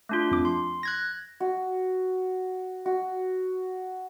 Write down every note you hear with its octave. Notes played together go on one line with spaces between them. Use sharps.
A3 D4 F4
F2 D6
C6
F#6 G#6 A#6
F#4
F#4